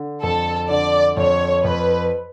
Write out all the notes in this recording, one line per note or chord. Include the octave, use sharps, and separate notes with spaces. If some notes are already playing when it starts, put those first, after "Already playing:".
Already playing: D3
F2 A4
D3 D5
F2 C#5
F2 B4